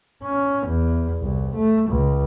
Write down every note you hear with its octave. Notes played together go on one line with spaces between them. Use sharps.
C#4
E2
C2
A3
C#2